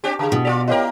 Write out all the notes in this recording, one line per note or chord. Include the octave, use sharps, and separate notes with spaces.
C4 D4 G4
C#3 G#4 F5 A5
B2 D4 E4 D#6
F4 G#4 D5 B6 F7
E4 G4 A#4 C#5 D#5